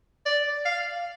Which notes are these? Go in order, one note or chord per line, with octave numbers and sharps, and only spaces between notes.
D5
F5